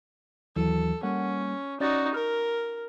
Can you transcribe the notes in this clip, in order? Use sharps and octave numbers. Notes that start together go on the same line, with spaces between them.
D#2 E3 F#3 A4
G3 A#3 C#4 F#5
C#4 D#4 F#4 D5 A6
A#4 F6